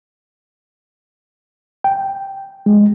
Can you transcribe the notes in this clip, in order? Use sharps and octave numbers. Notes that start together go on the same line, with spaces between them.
G5
G#3